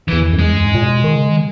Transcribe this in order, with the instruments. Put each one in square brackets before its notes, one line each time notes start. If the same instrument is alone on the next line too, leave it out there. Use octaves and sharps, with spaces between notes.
[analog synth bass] E2 [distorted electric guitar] E3
[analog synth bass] F#2
[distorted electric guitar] G#3
[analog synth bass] E2
F#2
G#2
A#2
B2
D#3
C#3
D#3